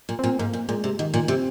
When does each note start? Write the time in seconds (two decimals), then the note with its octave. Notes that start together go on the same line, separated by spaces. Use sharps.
0.09 A#2
0.19 A#2 C4
0.39 G#2 A#3
0.53 A#2
0.69 A#2 G#3
0.84 C3
0.99 G#2 D#3
1.14 A#2
1.28 C3 C4